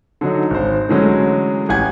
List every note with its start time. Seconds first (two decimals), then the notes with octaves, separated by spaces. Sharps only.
0.21 D3 F#3 D#4
0.50 G#1 C5
0.89 D3 E3 F#3 G#3 A3 C#4
1.69 A1 G4 F#5 G#5 G#6